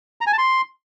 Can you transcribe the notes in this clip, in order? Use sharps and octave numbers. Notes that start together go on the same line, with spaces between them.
A#5
G#5
A5
C6